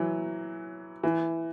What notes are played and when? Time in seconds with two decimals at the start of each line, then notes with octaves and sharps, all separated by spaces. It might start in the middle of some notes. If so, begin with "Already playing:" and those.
Already playing: E3 F#3
1.04 E3